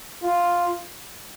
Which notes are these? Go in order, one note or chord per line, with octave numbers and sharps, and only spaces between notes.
F4